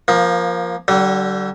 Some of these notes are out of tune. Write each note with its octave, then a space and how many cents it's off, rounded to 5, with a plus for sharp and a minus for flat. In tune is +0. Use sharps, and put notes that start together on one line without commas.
F3 +5 A#3 +20
D3 +0 G3 -40